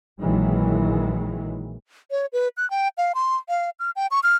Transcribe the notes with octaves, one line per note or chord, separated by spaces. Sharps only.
A#1 D#3 E3 F#3 G#3
C#5
B4
F#6
G5
F5
C6
F5
F6
G5
C#6
F6